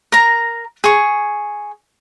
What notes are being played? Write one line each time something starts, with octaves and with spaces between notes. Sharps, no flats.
A#4 A#5
G#4 C#6